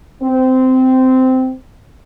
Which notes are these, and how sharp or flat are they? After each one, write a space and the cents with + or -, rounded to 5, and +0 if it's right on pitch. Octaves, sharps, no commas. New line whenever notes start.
C4 -15